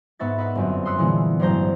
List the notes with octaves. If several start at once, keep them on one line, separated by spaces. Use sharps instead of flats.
G#2 B3 E5 B5 C#6 A6
A#4 B4 D#5 E5 F#5
G1 F#2 C4
C6 D#6 E6 F#6 B6 C#7
A#2 D3 E3 G#3 B3
A1 G2 F#3 C5 A#5 G6